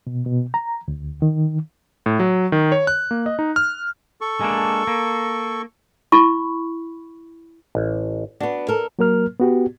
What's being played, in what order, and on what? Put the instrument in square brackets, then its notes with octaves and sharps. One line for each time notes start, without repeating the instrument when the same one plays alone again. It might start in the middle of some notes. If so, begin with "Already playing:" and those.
[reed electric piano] B2
B2
A#5
D2
D#3
[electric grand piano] A2
F#3
D#3
C#5
F#6
A#3
D#5
D#4
F6
[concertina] A4 C#6
[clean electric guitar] G#3 A#3 D4
A#3
[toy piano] E4 B5 C#6
[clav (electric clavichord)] A1
[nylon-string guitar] B3 D4 [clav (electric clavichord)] F#4
[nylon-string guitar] A4 A#4
[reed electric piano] F#3 A#3 A#4 F6
B3 F#4 G4